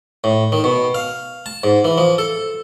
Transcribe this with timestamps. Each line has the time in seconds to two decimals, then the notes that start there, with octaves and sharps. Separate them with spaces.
0.24 A2
0.52 D#3
0.64 B2
0.95 F5
1.46 A5
1.64 G#2
1.84 E3
1.98 F3
2.18 A4